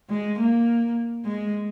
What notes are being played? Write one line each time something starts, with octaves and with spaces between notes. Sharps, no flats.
G#3
A#3
G#3